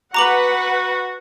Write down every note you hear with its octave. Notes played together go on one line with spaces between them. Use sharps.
F#4 B4 F#5 A#5 D6 F#7